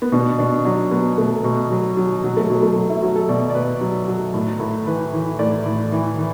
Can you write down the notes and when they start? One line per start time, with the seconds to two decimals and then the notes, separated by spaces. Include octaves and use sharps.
0.02 B3
0.12 B2 D4
0.39 B2 D4
0.65 F#3 D4
0.91 F#3 B3
1.18 B2 A3
1.44 B2
1.70 F#3
1.97 F#3
2.23 B2 F#3
2.37 A3
2.50 B2 F#3
2.63 A3
2.76 F#3
2.89 E4
3.02 F#3 F#4
3.16 A4
3.29 B2 D5
3.50 D5
3.55 B2 B4
3.81 F#3
4.08 F#3
4.34 A2
4.60 A2
4.87 E3 B4
5.13 E3
5.39 A2 D5
5.66 A2
5.92 E3
6.18 E3